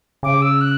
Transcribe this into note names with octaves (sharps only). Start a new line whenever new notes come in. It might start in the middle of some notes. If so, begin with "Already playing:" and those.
C#3 D6
E6
F#6